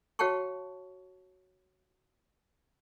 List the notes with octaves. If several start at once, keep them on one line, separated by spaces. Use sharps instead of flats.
F#4 C#5 F5 G5 A5 C#6